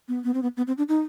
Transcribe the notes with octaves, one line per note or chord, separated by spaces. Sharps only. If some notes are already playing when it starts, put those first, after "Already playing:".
B3
B3
C4
B3
B3
C4
D4
D#4